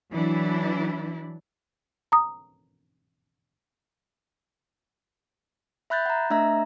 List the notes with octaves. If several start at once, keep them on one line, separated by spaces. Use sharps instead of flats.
E3 F#3 D4 E4
A#5 D#6
E5 B5 F#6 G6 A6
F#5 A#5
A3 D4 D#5 E5 A#5